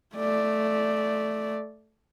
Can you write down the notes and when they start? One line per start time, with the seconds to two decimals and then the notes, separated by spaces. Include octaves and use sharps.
0.15 A3 D5